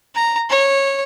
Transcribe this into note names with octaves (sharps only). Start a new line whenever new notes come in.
A#5
C#5